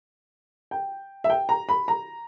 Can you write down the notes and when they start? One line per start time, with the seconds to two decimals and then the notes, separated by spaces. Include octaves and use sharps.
0.71 G5
1.24 E5
1.30 G5
1.49 A#5
1.69 B5
1.88 A#5